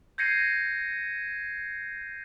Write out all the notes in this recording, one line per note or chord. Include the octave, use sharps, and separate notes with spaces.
G6 G#6 A#6 C7 C#7 D#7